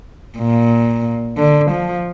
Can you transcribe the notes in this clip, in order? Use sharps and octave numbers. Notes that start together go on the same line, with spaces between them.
A#2
D3
F3